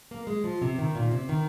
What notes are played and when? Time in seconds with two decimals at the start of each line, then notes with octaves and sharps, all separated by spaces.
0.11 A#3
0.27 G#3
0.44 F3
0.61 C3
0.79 D#3
0.95 A#2
1.12 C3
1.29 D#3